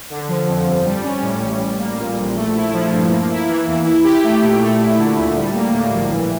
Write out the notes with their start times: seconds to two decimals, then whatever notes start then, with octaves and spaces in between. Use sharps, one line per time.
0.10 D3
0.28 F3
0.48 F2
0.66 G1
0.85 G3
1.03 C#4
1.22 A2
1.42 A1
1.60 G3
1.79 A#3
1.98 A#2
2.17 A#1
2.36 A3
2.55 E4
2.73 F3
2.92 G2
3.10 A#3
3.30 E4
3.48 E3
3.67 E2
3.86 E4
4.04 G4
4.23 A3
4.42 A#2
4.61 A3
4.79 E4
4.98 D3
5.18 D2
5.36 G3
5.54 A#3
5.73 A2
5.93 A#1
6.11 E3